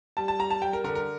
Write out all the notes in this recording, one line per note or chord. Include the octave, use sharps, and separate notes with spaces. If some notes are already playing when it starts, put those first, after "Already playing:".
G3 A5
A5
G3 A#5
A5
G3 G5
A#4
D3 A#4
A#4